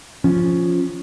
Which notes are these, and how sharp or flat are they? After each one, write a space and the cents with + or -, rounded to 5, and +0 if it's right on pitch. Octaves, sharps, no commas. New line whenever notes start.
F3 +0 C#4 +0